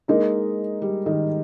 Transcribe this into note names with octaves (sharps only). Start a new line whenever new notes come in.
G#3 A#3 D#4 A#4
G3
D#3